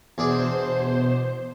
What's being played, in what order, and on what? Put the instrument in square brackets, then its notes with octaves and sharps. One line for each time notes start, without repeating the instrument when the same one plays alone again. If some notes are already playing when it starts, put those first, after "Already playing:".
[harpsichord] E2 D4 G#4 [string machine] B2 C5